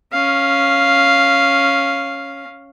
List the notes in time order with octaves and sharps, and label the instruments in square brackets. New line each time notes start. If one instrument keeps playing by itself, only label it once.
[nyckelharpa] C#4 F5